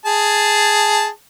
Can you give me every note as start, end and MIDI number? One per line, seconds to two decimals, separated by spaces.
0.06 1.08 68
0.06 1.08 81